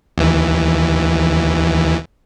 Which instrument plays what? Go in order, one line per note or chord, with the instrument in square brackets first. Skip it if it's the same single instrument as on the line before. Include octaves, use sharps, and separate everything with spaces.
[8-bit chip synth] D#2 E3